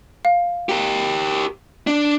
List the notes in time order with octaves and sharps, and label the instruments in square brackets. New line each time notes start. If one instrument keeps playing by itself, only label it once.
[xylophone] F5
[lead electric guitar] G4 A#4
D4